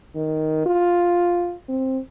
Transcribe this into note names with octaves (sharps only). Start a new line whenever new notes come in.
D#3
F4
C4